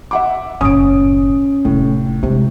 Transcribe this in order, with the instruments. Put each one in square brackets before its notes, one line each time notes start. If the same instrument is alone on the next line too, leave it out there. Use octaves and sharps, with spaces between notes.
[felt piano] E5 F#5 D6
[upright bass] F#1 A2 [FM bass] C#4 [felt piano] D#6 D7
[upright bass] F1 [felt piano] A2
[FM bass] C3 [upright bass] G#3 D4